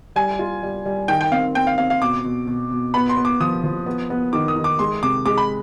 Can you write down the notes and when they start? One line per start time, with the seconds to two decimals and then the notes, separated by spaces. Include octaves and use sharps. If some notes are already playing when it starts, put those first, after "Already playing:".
0.16 G3 G#5
0.39 F4
0.63 G3
0.85 G3
1.08 D#3 G5
1.21 G5
1.32 C4 F5
1.55 C4 G5
1.67 F5
1.78 C4 F5
1.90 F5
2.01 B2 D6
2.24 B2
2.47 B2
2.71 B2
2.94 B3 B5
3.09 C6
3.17 B3
3.25 D6
3.40 F3 D#6
3.64 F3
3.86 B3
4.10 B3
4.33 D#3 D6
4.48 D#6
4.56 D#3
4.64 D6
4.79 G#3 C6
5.03 C3 D6
5.26 G#3 D6
5.38 B5